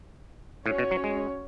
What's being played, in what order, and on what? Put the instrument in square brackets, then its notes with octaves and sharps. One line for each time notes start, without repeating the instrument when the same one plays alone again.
[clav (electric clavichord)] A2 [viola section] C#4 F#4 C#5
[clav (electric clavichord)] B2
F#3
G#3